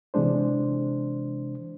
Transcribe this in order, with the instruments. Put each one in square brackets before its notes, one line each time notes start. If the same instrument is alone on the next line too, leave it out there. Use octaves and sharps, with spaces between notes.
[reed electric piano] C3 E3 G#3 D4 C5